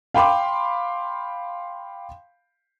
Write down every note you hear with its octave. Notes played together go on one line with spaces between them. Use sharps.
F5 G5 B5 C6 D6